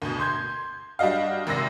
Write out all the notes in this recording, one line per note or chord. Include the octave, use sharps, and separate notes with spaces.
D2 B2
C6 G6 G#6
G3 D4 F#4 D#5 F5
G#1 C3 E6 A#6 C7